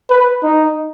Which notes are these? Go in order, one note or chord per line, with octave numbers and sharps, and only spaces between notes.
B4
D#4